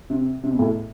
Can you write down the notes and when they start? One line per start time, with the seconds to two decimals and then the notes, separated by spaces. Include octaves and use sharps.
0.10 C3
0.44 C3
0.51 B2
0.59 A2